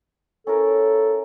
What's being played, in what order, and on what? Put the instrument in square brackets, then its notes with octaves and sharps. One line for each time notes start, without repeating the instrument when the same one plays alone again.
[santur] C#4 E4 A#4 [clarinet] A4